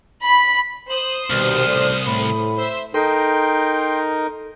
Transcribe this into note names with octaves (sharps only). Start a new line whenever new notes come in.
B5
C5 D#6 F#7
C2 B2 D#3 G3 F6
A1 A4 D5
A2 B5
C5 E5
D#4 A4 A#4 G5 C6